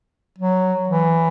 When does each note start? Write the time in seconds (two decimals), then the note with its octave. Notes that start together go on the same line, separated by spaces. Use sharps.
0.38 F#3
0.89 E3